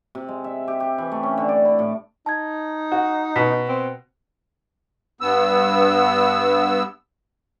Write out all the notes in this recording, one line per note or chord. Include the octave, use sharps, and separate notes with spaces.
C3
G#3
E5
G4
G4
E3
A3
C#4
D3
D5
E4
A2
D#4 A5 G#6
F#4
B2 B6
C4
G2 B3 E6